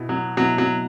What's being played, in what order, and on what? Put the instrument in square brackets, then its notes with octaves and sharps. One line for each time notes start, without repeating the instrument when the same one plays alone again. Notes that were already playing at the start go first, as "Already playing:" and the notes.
Already playing: [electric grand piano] B2 B3 E4
[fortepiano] F#3
[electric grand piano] B2 B3 E4 [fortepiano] F#3
[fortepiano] F#3